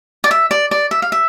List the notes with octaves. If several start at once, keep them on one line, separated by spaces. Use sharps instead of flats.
D5
E5
D5
D5
E5
F5
E5